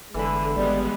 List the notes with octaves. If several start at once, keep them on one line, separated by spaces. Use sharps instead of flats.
G1 D3 E3 G#3 B5
G#1 G3 G#3 B3 D5